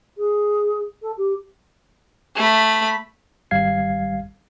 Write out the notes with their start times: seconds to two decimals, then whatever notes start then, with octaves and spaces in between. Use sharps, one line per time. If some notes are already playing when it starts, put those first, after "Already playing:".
0.18 G#4
1.02 A4
1.17 G4
2.35 A3 B5
3.51 G#1 G3 F5 G#6 C7